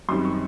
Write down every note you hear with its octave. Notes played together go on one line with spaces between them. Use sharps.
F#2 D#3 G3 C4 C6
C#6